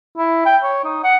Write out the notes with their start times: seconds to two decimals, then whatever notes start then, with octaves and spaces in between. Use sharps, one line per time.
0.18 E4
0.46 G5
0.63 C#5
0.85 D#4
1.04 F#5